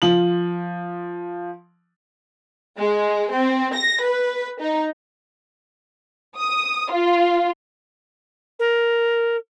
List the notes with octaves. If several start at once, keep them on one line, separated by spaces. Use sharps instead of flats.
F3 F#7
G#3
C4
A#6
B4
D#4
D#6
F4
A#4